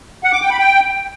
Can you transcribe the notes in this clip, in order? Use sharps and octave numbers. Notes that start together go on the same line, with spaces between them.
F#5
D6
G5
B5
G5